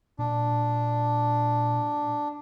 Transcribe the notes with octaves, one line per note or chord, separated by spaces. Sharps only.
A#2 D4